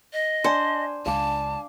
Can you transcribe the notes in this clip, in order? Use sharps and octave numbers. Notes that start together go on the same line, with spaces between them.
D#5
D4 C5 G#5
C#2 D4 F5 A5 D6